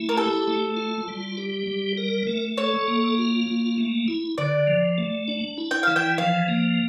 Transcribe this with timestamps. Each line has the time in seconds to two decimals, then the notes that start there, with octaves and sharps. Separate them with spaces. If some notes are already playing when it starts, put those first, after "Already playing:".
Already playing: A3 E4
0.09 A#4
0.17 G4 A4
0.48 A3
0.77 F4
1.08 G3
1.37 G4
1.67 G3
1.98 A#4
2.27 A3
2.57 A4 C#5
2.88 A#3
3.18 F4
3.48 A#3
3.78 A3
4.08 E4
4.38 D3 D5
4.67 F3
4.98 A3
5.28 D4
5.58 E4
5.71 G5
5.83 E3 F5
5.96 G5
6.18 F3 F5
6.48 A#3